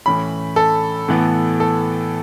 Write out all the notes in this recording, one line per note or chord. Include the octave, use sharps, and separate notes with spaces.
A2 E3 C#4 B5
A4
A2 E3 B3
A4